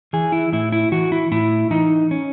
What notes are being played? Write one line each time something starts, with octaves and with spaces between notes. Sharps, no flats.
E3 G#4
E4
A2 E4
E4
E3 F#4
E4
A2 E4
E3 D#4
C#4